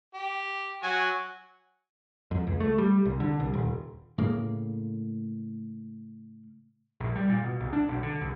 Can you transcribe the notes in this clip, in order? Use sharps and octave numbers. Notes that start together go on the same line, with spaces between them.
G4
F#3 F#4 G#5
F2
C#2
A3
G3
C2
D3
C2
D#1
A2 C#3 A#3
A#1
G3
A#2
B2
C2
D4
B1
D3
C2